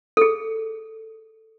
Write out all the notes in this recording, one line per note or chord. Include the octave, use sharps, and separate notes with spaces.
G#4 A4